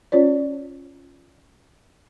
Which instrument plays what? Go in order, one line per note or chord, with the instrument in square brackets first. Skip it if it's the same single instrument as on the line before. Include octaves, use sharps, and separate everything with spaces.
[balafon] C#4 F4 C#5 D5